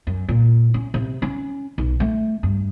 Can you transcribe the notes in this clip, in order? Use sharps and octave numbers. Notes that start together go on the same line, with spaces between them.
F#2
A#2
C#4
C3
C#4
B1
A3
G2